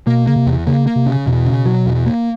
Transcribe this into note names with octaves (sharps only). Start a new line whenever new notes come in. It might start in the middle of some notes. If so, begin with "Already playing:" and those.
B2 A#3
C#3 A#3
C3
E2
C#3 A#3
A#3
C3
C#3
E2 B2
C#3
F#3
E2
A#3